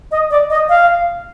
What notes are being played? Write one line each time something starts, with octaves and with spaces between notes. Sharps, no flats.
D#5
D5
D#5
F5